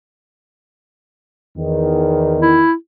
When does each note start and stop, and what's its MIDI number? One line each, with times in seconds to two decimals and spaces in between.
1.58 2.65 40
1.58 2.65 51
2.41 2.73 64